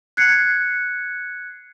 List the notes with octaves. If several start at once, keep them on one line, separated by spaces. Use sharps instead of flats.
F#6 G#6 C7 C#7